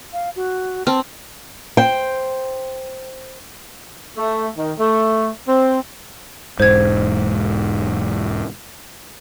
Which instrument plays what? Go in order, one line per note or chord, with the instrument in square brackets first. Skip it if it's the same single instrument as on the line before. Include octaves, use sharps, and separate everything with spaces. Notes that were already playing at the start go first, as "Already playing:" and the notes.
[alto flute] F5
F#4
[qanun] C4 [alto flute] A5
[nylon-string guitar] C5 G5
[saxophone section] A3
D#3
A3
C4
[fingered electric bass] E1 G#2 [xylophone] C5 G#6